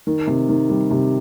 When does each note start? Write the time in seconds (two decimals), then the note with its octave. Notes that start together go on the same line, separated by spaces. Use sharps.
0.07 D#3
0.27 C3
0.49 D#3
0.70 G3
0.91 C3